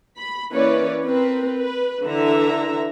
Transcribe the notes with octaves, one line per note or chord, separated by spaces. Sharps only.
B5
E3 A#3 C#4 B4 C#5 D5
C4 A#4 B4
B4
D3 E3 E5 A#5